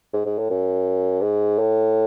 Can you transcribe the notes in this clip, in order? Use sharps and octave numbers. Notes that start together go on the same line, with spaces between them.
G#2
G#2
A2
F#2
G#2
A2